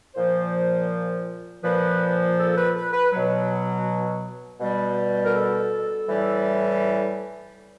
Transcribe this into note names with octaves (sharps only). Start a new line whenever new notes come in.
A#2 F3 C5
A#2 F3 B4
A4
B4
B4
B4
B2 F#3
B2 G3
A#4
A4
A2 E3 G3